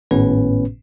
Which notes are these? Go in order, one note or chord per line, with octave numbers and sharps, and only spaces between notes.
G#1 A2 B3 C#4 B4